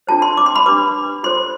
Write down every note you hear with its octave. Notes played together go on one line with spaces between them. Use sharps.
D4 F4 A4 C5 A5
C6
D6
C6
B5
D4 G4 B4 D6
F4 A4 C5 C6